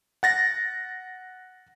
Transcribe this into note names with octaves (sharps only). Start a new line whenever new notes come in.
F#5 A6 A#6